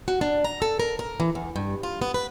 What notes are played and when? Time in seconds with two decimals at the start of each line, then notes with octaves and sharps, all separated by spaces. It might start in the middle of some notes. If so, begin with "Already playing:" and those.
0.08 F#4
0.21 D4
0.44 A#5
0.62 A4
0.80 A#4
0.99 A#4
1.20 E3
1.35 E2
1.56 G2
1.83 F4
2.02 B3
2.14 B4